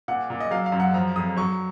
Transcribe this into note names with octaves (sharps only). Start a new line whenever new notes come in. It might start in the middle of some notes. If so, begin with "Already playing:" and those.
A#2 F#5
A#2
D#5
F#3 F5
F5
F#2
F#5
F3 A#5
F2 D#6
F#3 C#6